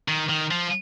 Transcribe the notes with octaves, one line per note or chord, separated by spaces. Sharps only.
D#3
D#3
F3